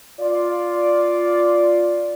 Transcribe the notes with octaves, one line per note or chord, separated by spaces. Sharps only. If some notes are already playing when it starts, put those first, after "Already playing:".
F4 D5